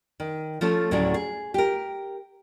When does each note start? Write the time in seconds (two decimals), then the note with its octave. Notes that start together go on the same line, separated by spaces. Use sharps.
0.20 D#3
0.61 F3 A3 C#4 A4
0.91 D2 A2 C#3 F#3 A3 D5
1.14 G#4
1.54 G4 A#4